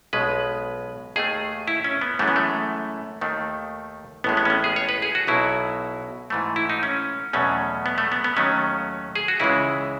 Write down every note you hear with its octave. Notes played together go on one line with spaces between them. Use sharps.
B1 B2 G#3 B4
D#2 D#3 A3 G#4
E4
C#4
B3
F#2 E3 G#3 A3
B3
A3
D#2 D#3 A3
A1 A2 G#3 B3
B3
C#4
B3
G#4
C#5
B4
G#4
F#4
B1 B2 F#3 E4
G#2 E3 A3
E4
D#4
C#4
E2 B2 F#3 A3 C#4
B3
A3
B3
B3
D#2 D#3 F#3 A3 C#4
G#4
F#4
C#2 C#3 E3 G#3 E4